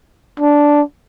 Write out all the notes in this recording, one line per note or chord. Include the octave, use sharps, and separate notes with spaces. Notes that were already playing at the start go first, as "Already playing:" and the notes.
D4